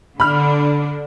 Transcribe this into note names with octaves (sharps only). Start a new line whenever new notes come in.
D3 D4 B5 F6